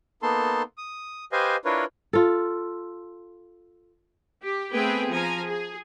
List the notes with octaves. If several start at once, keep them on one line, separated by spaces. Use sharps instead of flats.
A#3 B3 D#4 A4 A5 C6
D#6
G4 B4 C5 D#5 F5 G#5
D4 E4 F4 A#4 B4 C#5
F4 A4
G4
A3 B3 C4 G#4 B4 G5
F3 G#5 A#5
G#4